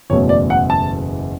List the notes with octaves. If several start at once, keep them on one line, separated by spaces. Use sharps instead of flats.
F#1 E2 B2 A3 C#5
D5
F#5
A5